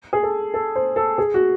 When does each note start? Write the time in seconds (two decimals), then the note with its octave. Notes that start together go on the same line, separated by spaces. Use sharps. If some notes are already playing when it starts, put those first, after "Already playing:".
0.13 G#4
0.23 A4
0.54 A4
0.75 C5
0.96 A4
1.18 G#4
1.34 F#4